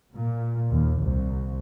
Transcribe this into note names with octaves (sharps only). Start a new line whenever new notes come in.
A#2
D#2
C2